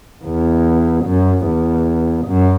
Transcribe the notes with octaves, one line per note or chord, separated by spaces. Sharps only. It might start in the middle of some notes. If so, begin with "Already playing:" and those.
E2
F#2
E2
F#2